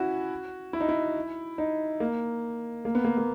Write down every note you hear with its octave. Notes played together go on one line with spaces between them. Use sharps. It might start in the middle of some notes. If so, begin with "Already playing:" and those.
Already playing: C#4 E4 F#4
E4
D#4
E4
D#4
A#3
A#3
B3
A#3
A#3